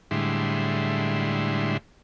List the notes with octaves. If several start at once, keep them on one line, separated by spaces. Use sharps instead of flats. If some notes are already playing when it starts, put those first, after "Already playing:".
A2 D3 G3 G#3 E4 C6